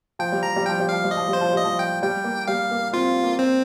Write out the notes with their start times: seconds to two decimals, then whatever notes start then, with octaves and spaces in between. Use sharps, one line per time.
0.19 F3 G5
0.32 G3
0.43 F3 A#5
0.56 G3
0.66 F3 G5
0.80 G3
0.89 F3 F5
1.04 G3
1.11 D#5
1.17 F3
1.28 G3
1.33 C5
1.41 F3
1.53 G3 D#5
1.64 F3
1.79 G5
2.03 G3 G5
2.24 A#3
2.48 G3 F5
2.71 A#3
2.93 C4 F4
3.23 A#3
3.39 C4